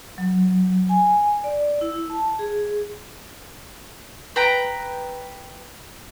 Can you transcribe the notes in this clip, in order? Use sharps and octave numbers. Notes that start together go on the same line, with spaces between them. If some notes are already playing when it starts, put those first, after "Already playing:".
F#3
G#5
D5
E4
A5
G#4
B4 G5 A#5